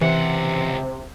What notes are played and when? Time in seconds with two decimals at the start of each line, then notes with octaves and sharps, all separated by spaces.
0.01 C#2 C3 E3 F#5